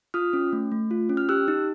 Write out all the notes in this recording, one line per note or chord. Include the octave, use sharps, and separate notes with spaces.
F4 D#6 F6
C#4
A3
A3
F4
C#4
F6
G4 E6 F#6
D#4